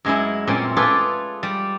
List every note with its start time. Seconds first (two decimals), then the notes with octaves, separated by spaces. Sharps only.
0.05 F#2 G#3 C#4 E4
0.47 A#2 C4 C#4
0.77 F4 G#4 A4 B4 D5
1.43 G3